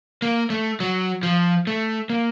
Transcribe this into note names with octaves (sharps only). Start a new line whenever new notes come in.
A#3
A3
F#3
F3
A3
A#3